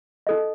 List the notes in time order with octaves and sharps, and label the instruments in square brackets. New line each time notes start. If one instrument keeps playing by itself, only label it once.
[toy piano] D#4 A4 D#5